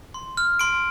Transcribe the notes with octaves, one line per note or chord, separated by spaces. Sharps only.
C6
F6
C6 D7